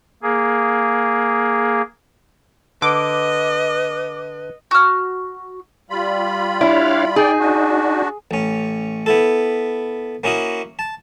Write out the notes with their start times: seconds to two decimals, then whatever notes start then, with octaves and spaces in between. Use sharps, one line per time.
0.22 A#3 G#4
2.82 D3 B4 D#5 D6
4.71 F#4 F6
5.90 G3 F4 B5
6.61 D4 E4 C#5 F5
7.16 D#4 G#4 D5 G5
7.39 D4 F#4
8.31 A1 C#4
9.06 B3 E4 A4
10.24 A#3 C#4 E4 F#4 D#5
10.79 A5